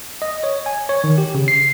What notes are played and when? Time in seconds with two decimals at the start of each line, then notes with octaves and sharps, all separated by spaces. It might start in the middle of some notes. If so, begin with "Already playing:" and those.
0.22 D#5
0.44 C#5
0.66 G#5
0.89 C#5
1.04 D#3
1.18 G4
1.35 C#3
1.48 C7